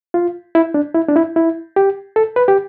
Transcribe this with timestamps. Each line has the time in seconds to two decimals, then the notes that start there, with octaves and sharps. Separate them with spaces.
0.14 F4
0.55 E4
0.74 D4
0.94 E4
1.08 D4
1.16 E4
1.36 E4
1.76 G4
2.16 A4
2.36 B4
2.48 G4